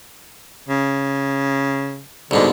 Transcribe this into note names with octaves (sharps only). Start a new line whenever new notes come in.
C#3
C2 G#2 B2 D3